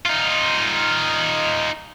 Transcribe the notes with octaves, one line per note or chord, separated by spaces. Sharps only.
D#4 F4